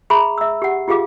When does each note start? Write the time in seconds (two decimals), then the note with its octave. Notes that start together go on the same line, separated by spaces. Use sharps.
0.10 G#4 E5 A#5 B5 C#6
0.38 E5 E6
0.62 G4 F#5
0.88 F4 G4 G#4 F5 D6